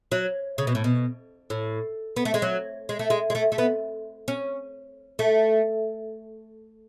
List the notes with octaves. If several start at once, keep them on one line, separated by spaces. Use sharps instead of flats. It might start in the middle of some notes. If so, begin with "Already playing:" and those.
F#3
C#3
B2
A2
B2
A2
B3
A3
G#3
F#3
G#3
A3
G#3
G#3
A3
A3
B3
C#4
A3